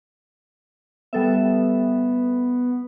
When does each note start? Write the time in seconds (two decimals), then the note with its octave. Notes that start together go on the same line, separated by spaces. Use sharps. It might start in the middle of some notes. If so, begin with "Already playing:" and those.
1.13 G3 B3 A4 E5